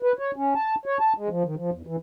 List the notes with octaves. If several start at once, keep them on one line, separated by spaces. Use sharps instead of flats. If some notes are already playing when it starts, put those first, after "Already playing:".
B4
C#5
C#4
A5
C#5
A5
G#3
F3
D#3
F3
E2
E3